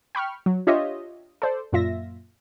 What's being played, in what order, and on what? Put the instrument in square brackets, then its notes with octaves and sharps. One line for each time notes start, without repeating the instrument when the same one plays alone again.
[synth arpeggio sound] G5 B5 C#6 F6
F#3
D4 F4 G4 C#5 D#5 E5
A4 C5 D5
F#2 A#2 F4 E5 A#6